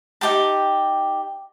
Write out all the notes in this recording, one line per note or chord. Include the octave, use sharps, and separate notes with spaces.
D#4 G4 G5 A5